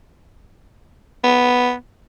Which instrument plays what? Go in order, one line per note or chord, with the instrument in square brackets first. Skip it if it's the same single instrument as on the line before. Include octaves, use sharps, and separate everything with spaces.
[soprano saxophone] B3